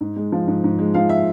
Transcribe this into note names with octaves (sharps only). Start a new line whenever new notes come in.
G#2
G#3
F3
G#2
G#2
G#3
F3 F5
E5